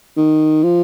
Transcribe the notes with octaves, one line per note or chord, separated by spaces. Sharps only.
D#3
F3